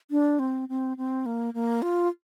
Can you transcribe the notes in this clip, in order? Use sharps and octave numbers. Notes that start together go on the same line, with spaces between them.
D4
C4
C4
C4
A#3
A#3
F4